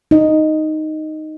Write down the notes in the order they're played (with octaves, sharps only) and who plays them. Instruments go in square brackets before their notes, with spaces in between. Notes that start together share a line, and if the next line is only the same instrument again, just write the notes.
[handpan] D#4 D#5